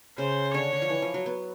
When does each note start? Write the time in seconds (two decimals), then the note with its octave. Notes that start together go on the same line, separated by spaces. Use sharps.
0.18 C#3 C5
0.54 D3 C#5
0.73 D3
0.82 F3
0.90 E3
1.02 F3
1.14 F#3
1.26 B3